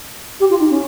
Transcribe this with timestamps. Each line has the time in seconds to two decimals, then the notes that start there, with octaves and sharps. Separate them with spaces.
0.40 G4
0.49 F4
0.60 D#4
0.70 C#4